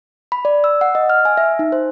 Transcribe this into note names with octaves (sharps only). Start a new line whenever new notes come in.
B5
D5
E6
F#5
D#5
F6
G#5
E5
D#4
C5